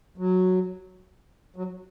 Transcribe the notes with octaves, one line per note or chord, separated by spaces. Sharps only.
F#3
F#3